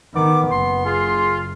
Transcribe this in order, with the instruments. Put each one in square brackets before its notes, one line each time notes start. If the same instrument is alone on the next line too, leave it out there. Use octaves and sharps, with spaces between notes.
[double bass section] D#3 [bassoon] B3 [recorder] D6
[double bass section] F#1 [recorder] C6
[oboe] F4 [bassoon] G#4